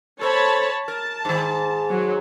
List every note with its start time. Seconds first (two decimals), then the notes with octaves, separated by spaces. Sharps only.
0.21 A4 C5 C#5 A5 B5
0.88 A#4 A5
1.25 G#2 D#3
1.90 F#3